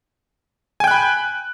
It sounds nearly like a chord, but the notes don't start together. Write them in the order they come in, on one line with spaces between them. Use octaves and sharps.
G#5 G5 F#6 B5